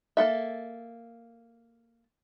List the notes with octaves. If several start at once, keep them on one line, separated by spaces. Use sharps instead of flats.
A#3 A4 E5